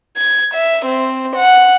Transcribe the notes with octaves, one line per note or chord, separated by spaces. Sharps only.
G#6
E5
C4
F#5